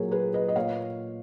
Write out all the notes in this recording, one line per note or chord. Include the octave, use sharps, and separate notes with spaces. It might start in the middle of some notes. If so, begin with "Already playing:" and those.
Already playing: A#2 F#3 G#4 A#4 C#5
G#4 B4
B4 D#5
D#5
A#2 C#5 F5